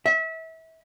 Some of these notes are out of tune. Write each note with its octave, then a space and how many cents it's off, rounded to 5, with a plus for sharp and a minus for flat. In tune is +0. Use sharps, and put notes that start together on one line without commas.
E5 -30